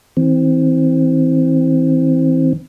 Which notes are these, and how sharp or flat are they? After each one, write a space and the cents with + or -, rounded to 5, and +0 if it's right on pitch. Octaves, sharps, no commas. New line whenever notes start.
E3 -35 C4 +0